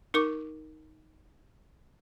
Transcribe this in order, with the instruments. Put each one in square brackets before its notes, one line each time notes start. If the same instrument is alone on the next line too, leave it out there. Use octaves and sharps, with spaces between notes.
[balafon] D#4 A#4 C#6 D6